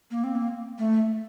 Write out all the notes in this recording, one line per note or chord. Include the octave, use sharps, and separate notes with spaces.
A#3
C4
A#3
A3